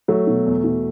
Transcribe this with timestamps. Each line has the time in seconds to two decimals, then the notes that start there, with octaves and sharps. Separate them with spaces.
0.08 F#3 A3
0.27 B2
0.46 E2
0.64 B2